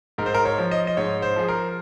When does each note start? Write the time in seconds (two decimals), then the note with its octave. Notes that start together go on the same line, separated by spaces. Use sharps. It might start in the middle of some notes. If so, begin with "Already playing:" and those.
0.18 G#2 A#4
0.26 C5
0.34 A#4
0.45 C#5
0.58 F3
0.71 D#5
0.87 D#5
0.97 G#2 C#5
1.22 C5
1.36 F3 G#4
1.48 A#4